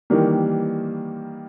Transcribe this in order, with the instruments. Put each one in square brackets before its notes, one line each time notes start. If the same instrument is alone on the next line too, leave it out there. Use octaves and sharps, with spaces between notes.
[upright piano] D#3 E3 G3 A#3